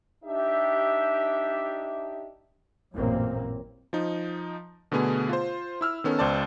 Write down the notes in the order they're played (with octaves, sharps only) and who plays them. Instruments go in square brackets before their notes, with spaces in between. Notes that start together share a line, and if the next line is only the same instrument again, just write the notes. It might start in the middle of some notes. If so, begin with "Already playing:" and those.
[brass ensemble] D4 D#4 G4 E5
[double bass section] A1 F#2 A#2 A#3 C4
[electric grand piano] F3 D#4
B2 D3 A3 B3 G#4
F4 C5
E4 E6 F6
D#3 B3 C#4 A4
C#2 C5 D5 A5